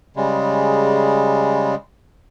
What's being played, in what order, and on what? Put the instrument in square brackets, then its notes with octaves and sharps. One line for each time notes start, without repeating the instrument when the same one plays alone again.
[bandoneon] C#3 G3 G#3